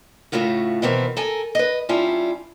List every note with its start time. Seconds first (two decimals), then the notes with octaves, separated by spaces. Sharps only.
0.32 A2 C#3 A3 F4 F#4
0.82 B2 D#3 E3 B3 C4 A#4
1.17 A4 A#4 G#5
1.55 B4 D#5
1.89 G3 C#4 D4 E4 F4